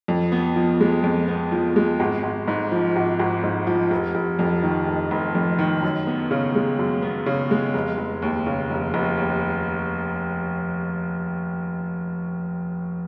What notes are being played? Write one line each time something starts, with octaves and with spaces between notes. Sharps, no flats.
F2
B3
F3
G#3
F2
B3
F3
G#3
G#1
G#1
G#2
F3
G#1
G#1
G#2
F3
F1
F1
F2
D#3
F1
F1
F2
D#3
F#2
B3
C#3
G#3
F#2
B3
C#3
G#3
F1
F1
D#2
C#3
F1
F1
D#2